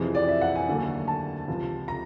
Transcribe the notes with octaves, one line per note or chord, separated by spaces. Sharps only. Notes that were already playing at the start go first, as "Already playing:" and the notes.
Already playing: F2 C3 E3 G#4
D5
E5
F#5
G#5
D#2 D3 F#3 A3
A5
C#2 C3 F3
A#5